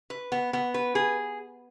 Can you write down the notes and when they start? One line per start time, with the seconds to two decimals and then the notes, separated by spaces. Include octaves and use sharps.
0.10 B4
0.32 B3
0.53 B3
0.74 B4
0.95 G#4